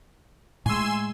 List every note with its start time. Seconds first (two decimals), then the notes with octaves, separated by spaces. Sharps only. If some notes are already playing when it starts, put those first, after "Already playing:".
0.66 A2 G#3 G#5 C6 E6